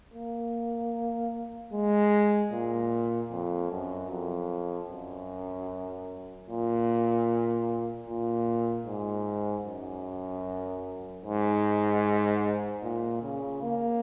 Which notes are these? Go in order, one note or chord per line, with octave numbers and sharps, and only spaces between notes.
A#3
G#3
A#2
F2
F#2
F2
F#2
A#2
A#2
G#2
F#2
G#2
A#2
C#3
A#3